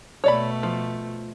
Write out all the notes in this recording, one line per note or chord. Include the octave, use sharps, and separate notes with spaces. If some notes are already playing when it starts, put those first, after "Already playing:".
B2 A3 C#5 D5 B5
F3